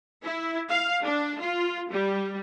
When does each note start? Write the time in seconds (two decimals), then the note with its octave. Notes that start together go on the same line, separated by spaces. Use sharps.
0.25 E4
0.69 F5
1.04 D4
1.40 F4
1.91 G3